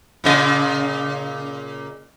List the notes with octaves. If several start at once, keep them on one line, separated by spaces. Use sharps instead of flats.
A#2 C#3 D#5